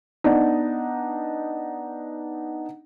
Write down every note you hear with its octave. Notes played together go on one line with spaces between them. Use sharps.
B3 D4 D#4